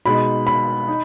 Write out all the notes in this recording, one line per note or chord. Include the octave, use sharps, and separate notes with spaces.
B2 G#3 D#4 B5
B5
D#4